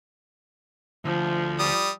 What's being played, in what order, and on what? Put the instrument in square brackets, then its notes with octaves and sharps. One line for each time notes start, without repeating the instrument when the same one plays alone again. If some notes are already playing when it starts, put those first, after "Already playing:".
[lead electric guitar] D2 [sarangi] F3
[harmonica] G3 D#6